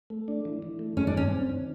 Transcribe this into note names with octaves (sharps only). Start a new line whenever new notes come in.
A3
D4
E3
E3
A3
G#3 C#4
D4
G2 C#4
C4
D#3